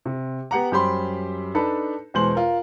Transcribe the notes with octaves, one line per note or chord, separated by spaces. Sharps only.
C3
B3 G4 F#5 A#5
F#2 G3 G4 C5 B5 C6
D4 D#4 A4 B4 B5
E2 B2 G#3 C5 C6 F#7
F4 A#4